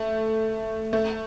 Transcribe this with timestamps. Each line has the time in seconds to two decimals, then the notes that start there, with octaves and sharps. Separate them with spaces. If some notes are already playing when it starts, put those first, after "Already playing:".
Already playing: A3
0.93 A3